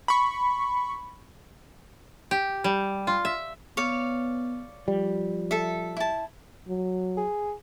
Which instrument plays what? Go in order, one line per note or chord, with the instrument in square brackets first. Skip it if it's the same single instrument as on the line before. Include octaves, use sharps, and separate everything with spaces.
[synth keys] B5 C#6
[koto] G4
G3
F4
E5
[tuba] B3 [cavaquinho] C#5 D5 F5
[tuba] F3 [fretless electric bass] G3
[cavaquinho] A4 E5
E4 A5
[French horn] F#3
[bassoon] G#4